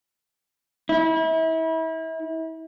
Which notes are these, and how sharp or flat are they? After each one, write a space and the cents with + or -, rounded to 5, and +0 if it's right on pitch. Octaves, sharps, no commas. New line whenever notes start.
E4 -35